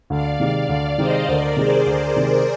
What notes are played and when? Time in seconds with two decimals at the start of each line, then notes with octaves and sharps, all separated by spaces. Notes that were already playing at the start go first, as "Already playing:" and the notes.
0.10 D2 D5 F5
0.39 C3 D#3 G#3 D5 F5
0.69 D2 D5 F5
0.98 C3 D#3 G#3 C5 D#5
1.28 D2 A#4 D5
1.57 C3 D#3 G#3 G#4 C5
1.86 D2 G#4 C5
2.16 C3 D#3 G#3 G#4 C5